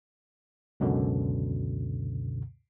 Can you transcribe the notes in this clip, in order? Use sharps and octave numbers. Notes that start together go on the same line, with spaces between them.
C#2 F#2 B2 D3